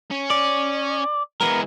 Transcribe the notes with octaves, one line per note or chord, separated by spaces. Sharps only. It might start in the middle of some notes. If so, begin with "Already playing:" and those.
C#4
D5
E3 G#3 B3 A#4